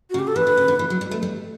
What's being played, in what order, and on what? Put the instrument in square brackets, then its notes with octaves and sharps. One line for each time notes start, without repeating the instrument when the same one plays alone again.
[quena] F#4
[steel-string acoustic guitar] C#3
[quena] G4
A4
[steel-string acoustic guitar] E3 [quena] B4
[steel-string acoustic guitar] D3
C#3
D3
E3
F#3
G3
A3
G3